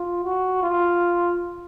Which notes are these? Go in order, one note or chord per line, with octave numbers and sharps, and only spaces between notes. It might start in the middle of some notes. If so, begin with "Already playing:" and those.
Already playing: F4
F#4
F4